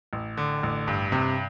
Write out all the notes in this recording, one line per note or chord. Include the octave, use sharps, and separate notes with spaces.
A1
D3
A1
G2
C3